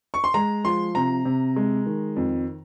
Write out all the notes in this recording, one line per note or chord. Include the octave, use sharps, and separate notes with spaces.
C#6
C6
G#3 A#5
F3 C6
C3 A#5
C3
G#3
D#3
F2